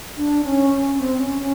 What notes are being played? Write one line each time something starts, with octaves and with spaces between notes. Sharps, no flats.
D4
C#4
C#4
C4
C#4
C#4